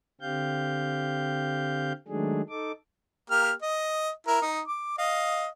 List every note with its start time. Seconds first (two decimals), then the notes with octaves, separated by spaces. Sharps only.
0.21 D3 C4 G4 F5 G6
2.08 D#3 F#3 G#3 A3 D4 G#4
2.49 D#4 A4 D6
3.30 A#3 G4 F6
3.62 D#5
4.27 E4 A#4 A#5
4.42 D#4 D#6
4.68 D6
4.98 D#5 F5